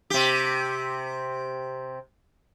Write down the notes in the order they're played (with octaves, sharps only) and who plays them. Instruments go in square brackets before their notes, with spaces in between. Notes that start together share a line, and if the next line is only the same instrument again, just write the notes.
[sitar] C3 G4